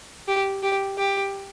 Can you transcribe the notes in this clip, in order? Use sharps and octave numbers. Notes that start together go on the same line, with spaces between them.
G4
G4
G4